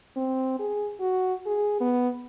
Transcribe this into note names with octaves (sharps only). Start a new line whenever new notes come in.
C4
G#4
F#4
G#4
B3